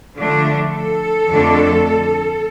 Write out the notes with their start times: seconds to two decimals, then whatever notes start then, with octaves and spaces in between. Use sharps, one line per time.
0.16 D3 F3 A3 D4
0.71 A4
1.28 F2 D3 A3 D4